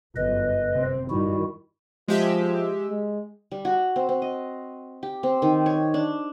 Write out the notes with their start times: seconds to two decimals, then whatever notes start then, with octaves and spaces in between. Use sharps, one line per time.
0.16 G1 F#2 B4 D#5
0.74 C3 C4
1.10 G2 D#3 G3 E4 F#4
2.08 F3 G#3 G4 E5
2.89 G#3
3.52 G3
3.65 F#4
3.96 C4
4.09 C4
4.22 D#5
5.03 G4
5.23 C4
5.42 D#3
5.66 C#5
5.94 D4